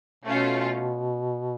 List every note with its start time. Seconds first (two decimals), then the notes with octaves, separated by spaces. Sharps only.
0.24 B2 A3 C#4 F4